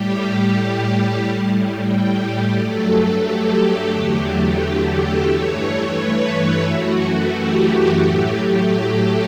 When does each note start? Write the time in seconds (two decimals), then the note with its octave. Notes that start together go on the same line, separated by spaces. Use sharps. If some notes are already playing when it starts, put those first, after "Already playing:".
Already playing: A2 G3 G4
1.17 A2 G3
1.85 G4
2.54 G2 F#3 A3 A4
3.21 G4
3.90 E2 D3 F#3 A3
4.59 G4
4.93 A4
5.26 G2 E3 A3 C#5
5.94 B4
6.63 F#2 E3 A3 F#4
7.31 G4
8.00 A2 F#3 A3
8.68 A4